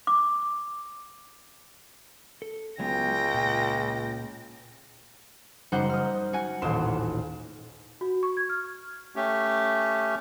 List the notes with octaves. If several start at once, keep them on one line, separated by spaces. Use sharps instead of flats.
D6
A4
C#2 F#3 G#3 B3 G5 A#6
A#2
F#1 G3 D#4 C5 F#5 G6
D#6 F6
F#4 F#5 G#5
D#1 A1 C6 E7
F#4
C#6
G#6
F6
A3 C#4 G4